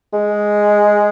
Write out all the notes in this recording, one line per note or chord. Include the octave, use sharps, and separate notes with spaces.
G#3